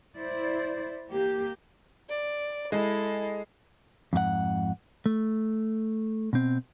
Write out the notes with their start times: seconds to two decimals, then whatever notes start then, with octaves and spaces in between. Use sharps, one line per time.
0.17 E4 C5 D5
1.10 A#3 G4
2.09 D5
2.72 G#3 E4 A4
4.13 F2 G#2 F#4 F#5
5.06 A3
6.33 B2 C4